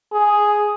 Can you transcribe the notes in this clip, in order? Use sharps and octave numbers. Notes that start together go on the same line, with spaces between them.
G#4